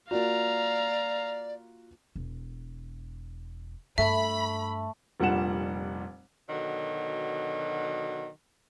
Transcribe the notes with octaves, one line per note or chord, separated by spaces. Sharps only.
A#3 F4 F#4 D5 F5 A#5
E1
G2 A3 E5 B5
F1 A#2 G3 D4 F#5 E7
B2 D3 D#3 F#3